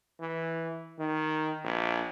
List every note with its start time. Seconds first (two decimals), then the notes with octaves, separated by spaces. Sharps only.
0.20 E3
0.99 D#3
1.64 A#1